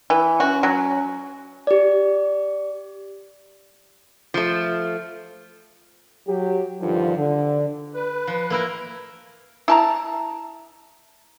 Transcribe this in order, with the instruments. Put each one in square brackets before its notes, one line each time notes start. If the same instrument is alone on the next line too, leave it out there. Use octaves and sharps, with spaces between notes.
[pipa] E3
[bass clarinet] C#4 [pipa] F#4
[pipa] F#3
[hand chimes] G4 D5
[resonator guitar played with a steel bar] F3 A3
[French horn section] F#3 G4
G2 D3 D#3 F3
D3
[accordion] B4
[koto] F3
A#3 E4 A#4
[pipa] E4 A5 A#5